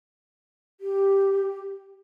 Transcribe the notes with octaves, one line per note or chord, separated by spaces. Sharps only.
G4